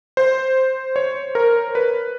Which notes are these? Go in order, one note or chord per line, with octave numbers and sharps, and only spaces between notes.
C5
C#5
A#4
B4